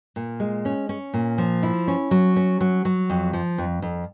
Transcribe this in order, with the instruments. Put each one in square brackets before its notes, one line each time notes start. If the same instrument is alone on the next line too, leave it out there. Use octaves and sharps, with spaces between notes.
[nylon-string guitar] A#2
G#3
C#4
C#4
A#2
F3
E4
C#4
F#3
C#4
F#3
F#3
F2
F3
F2
F2